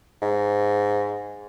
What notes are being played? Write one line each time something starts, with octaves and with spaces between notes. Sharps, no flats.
G#2